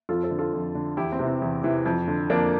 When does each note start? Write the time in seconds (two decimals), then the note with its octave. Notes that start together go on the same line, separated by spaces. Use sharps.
0.09 F2 F4 A4
0.23 A4 C5
0.31 D3
0.39 F4 A4
0.53 F2
0.75 D3
0.97 E2 E4 G4
1.11 C4 E4
1.19 C3 E3
1.27 C4
1.42 E2
1.63 C3 E3
1.85 F2
2.07 D3
2.30 F2 A#3 D4